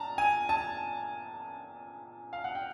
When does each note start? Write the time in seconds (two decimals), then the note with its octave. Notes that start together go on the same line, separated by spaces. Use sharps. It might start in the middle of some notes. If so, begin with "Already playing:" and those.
Already playing: A#2 A5 A#5
0.18 G#5
0.49 A5
2.33 F5
2.44 F#5
2.55 G5